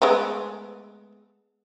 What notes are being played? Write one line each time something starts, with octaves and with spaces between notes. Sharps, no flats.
G#3 A3 B3